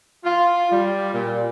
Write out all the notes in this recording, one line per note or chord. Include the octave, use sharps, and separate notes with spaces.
F4
G3
A#2